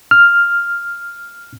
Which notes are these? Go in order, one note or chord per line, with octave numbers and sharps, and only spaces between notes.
F6